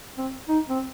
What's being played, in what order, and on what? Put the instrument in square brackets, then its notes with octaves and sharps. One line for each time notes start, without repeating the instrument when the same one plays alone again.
[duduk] C4
D#4
C4